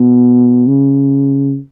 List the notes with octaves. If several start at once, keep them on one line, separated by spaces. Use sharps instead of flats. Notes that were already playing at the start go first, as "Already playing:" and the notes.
Already playing: B2
C#3